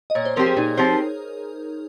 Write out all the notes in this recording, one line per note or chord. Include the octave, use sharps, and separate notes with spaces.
D#5
A#2 C#5
C5
F3 C4 G4 A#4 C5
G#4
A#2 D#4
F3 C4 G4 C5